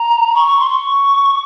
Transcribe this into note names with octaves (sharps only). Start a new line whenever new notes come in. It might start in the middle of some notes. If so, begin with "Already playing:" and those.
Already playing: A#5
C#6
C#6
C6
C#6